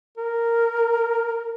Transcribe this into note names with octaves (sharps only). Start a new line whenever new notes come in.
A#4